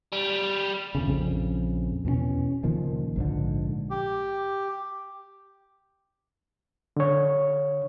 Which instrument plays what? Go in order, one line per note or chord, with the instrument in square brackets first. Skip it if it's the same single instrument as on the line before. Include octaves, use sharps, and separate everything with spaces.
[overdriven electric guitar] G3
[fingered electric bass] E2 C#3
A#1 F2 C#3
E2 B2 B3 C#4
C#2 A#2 D#3 F3
A#1 G#2 D3
[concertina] G4
[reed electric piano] D3 C#5